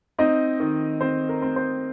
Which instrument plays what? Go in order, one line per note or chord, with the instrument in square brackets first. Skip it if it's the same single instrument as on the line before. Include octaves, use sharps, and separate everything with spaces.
[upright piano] C4 D#4 D#5
D#3
C4 C5
A#4
C4
C5